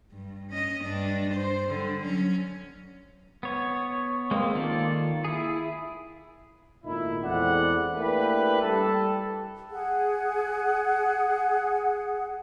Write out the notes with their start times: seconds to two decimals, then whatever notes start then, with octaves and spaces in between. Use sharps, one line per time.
0.12 G2
0.51 C#4 D#5
0.85 G2 D4
1.35 C5
1.69 D3 G3
2.02 F#3 C#4
3.43 B3 C#5
4.31 G#3 A#3 C4
4.55 D#3 A#3 F4 A4 D5
5.24 E4 G#4
6.84 G#1 A#2 A3 D#4 E4
7.24 E2 G#3 C4 A4 D5 F#5
7.93 A3 A#3 D4 E4 G4 B4
8.62 G3 G4 A4
9.70 G#4 F#5